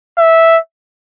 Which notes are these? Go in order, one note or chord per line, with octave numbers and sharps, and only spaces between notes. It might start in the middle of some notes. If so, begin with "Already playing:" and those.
E5